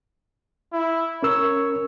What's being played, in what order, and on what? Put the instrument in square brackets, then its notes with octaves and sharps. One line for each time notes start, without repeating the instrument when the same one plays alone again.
[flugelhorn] E4
[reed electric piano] C#4 A#4 E6 [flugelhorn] C#5